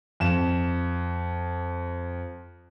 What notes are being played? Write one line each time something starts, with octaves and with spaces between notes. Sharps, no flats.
F2 E7